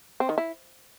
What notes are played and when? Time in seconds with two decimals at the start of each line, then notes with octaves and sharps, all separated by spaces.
0.20 C4
0.29 D#3
0.38 E4